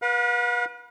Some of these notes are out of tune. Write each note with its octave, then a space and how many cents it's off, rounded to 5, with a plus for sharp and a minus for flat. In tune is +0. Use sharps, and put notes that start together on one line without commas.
B4 -30 F5 +45